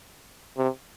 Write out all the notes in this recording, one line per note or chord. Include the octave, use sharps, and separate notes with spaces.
C3